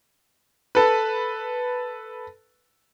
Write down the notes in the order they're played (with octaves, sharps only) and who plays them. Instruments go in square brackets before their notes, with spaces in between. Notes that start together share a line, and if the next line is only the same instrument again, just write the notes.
[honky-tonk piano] A4 B4